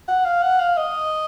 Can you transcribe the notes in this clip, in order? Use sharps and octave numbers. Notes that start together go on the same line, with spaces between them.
F#5
F5
F#5
F5
D#5